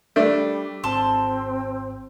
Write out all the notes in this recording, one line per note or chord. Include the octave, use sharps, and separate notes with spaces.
G3 A3 D4
G#1 C4 A5 C6 F6